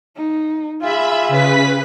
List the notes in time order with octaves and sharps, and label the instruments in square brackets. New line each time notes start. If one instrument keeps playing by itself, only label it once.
[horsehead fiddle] D#4
[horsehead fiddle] F4 G#4 [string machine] E5 B5
[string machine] C#3 B4 B6